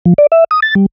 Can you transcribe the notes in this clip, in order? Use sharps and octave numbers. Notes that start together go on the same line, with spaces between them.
F3
D5
E5
D#6
A6
G3